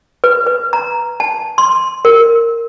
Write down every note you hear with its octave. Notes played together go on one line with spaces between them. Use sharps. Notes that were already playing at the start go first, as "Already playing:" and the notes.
B4
B4
A#5
A5
C6
A#4